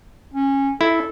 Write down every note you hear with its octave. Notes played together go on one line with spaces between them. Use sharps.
C#4
E4 A4